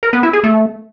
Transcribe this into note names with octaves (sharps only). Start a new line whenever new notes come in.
A#4
B3
E4
G#4
A3